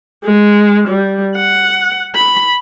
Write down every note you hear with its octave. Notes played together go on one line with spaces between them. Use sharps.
G#3
G3
F#5
B5